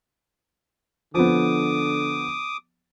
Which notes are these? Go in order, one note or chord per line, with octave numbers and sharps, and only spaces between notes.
D3 F3 B3 D6 D#6